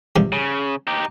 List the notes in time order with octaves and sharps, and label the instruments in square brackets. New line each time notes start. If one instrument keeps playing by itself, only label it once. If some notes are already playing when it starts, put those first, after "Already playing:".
[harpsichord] G2 C3 F3
[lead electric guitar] C#3
D#4 G4